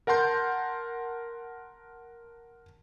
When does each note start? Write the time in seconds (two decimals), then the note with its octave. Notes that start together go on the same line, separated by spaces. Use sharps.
0.07 A#4 F#5 A5 C6 G6